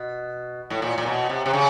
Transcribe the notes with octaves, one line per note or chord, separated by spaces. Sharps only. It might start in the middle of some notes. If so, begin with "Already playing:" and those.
Already playing: B2
A2
A#2
A#2
B2
C3
C3
C#3